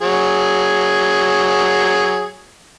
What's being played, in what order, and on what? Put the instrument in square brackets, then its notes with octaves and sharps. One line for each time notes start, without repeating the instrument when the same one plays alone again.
[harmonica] F#3 G#4